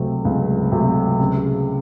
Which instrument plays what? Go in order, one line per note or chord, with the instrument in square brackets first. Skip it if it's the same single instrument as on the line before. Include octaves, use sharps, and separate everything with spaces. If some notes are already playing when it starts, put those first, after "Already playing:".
Already playing: [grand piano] C#2 C3 F#3 A3 C4
C#2
C3 F#3 A3 C4
C#3